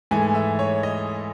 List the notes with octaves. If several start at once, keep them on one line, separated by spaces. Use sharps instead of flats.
G#2 E3 A3 G#5
E5
C#5
D#5